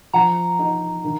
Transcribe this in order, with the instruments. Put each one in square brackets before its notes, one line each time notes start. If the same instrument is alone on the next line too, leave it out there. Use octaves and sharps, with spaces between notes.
[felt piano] F3 [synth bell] F#5 A#5
[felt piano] D#4
D#3